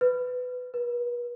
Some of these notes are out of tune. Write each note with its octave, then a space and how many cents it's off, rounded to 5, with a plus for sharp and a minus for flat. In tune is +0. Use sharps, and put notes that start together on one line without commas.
B4 +15
B4 -40